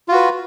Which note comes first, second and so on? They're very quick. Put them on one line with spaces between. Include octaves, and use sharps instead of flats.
F4 F#4 B4